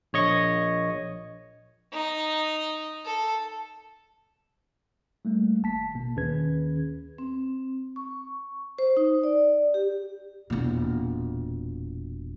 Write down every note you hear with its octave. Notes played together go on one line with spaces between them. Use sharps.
A#1 C#5 D#5 C#6
D#4
A4
G3 A3 A#3
G#1 A5 B6
B2 A#3
D#2 D#3 C#4 G#4 B4 G#6
C4
C#6
C5
D#4
D5
G4
E1 A#2